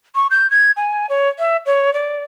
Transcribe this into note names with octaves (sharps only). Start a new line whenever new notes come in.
C#6
G6
G#6
G#5
C#5
E5
C#5
D5